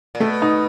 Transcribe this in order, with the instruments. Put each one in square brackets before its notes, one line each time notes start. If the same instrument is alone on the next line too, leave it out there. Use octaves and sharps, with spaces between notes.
[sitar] A#2
[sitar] B2 [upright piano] A3
[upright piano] D#4